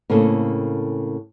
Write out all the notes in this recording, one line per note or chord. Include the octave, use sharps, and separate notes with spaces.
A2 C#3 A#3 C4 G#4 A4